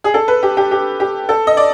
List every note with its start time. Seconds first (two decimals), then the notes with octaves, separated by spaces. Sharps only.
0.04 G#4
0.14 A4
0.28 B4
0.43 G4
0.57 G4
0.71 G4
1.00 G4
1.29 A4
1.47 D#5
1.57 D5